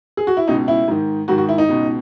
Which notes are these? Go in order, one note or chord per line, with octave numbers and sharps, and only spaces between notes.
G#4
F#4
E4
C#2 B2 D#4
E4
G#2 D#3
G#2 D#3 F#4
F#4
E4
D#4
C#2 B2